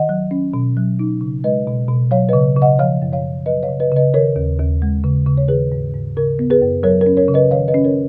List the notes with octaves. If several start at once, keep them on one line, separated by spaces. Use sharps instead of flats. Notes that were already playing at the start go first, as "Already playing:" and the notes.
Already playing: D#3 D#5 F#5
F#3
C#4
B2
F#3
D#4
C#3
G#3 B4 D#5
B2
B2
F#3 C#5 F5
B4 D#5
C#3
C#3
D#5 F#5
F3 C#5 F5
F#2
C#5 F5
F#2
F#3 B4 D#5
C#5 F5
C#3
B4 D#5
C#3 B4 D#5
D#3 A#4 C#5
D#2
D#2
G#3
C#3
C#3
C#5
D#3 G#4 B4
G#2
G#2
C#3 A#4
B3
G#4 B4
F#2
F#3 A#4 C#5
A#4
C#4
A#4 C#5
C#3
B4 D#5
D#3 C#5 F5
B4 D#5
C#4
A#4 C#5